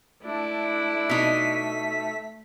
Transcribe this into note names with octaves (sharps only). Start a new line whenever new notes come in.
A3 D4 E4
B2 D#4 B6